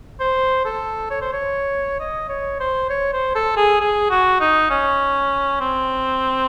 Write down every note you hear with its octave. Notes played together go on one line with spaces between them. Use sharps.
C5
A4
C#5
C5
C#5
D#5
C#5
C5
C#5
C5
A4
G#4
G#4
F#4
D#4
C#4
C4